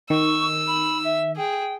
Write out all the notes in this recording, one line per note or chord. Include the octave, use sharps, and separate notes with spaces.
D#3 C#6 E6
B5
E5
G#4 G5